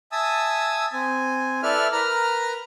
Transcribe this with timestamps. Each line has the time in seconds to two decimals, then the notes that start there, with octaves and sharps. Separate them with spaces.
0.12 E5 G#5 A5 D#6 E6
0.93 C4 G#5
1.63 E4 A4 B4 D5 E5 F6
1.92 A#4 B4 A#5 F6